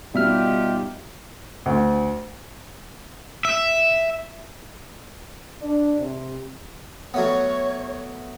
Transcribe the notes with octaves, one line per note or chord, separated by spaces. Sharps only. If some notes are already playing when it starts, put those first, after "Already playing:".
B2 G3 D#4 F4 G4 E5 F6
D2
E5
D4
C3
F#3 A3 B3 C#5